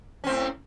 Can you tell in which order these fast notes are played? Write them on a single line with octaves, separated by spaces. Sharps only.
C#4 C4 A2